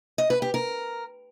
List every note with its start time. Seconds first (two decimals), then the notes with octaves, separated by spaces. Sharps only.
0.18 D#5
0.30 B4
0.42 G4
0.54 A#4